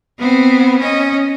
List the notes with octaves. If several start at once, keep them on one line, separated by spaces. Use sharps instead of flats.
B3 C4
C#4 D#5